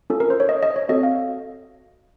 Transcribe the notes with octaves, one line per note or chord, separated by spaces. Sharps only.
C#4 F4 A4
A#4
C5
C#5
D#5
D#5
C#5
C4 F#4 A4 D#5
F5